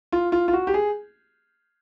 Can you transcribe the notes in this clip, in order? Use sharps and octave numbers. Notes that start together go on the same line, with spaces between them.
F4
F4
F4
F#4
G4
G#4